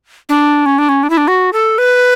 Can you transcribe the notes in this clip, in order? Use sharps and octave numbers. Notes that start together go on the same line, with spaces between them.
D4
C#4
D4
C#4
D4
E4
D4
F#4
A4
B4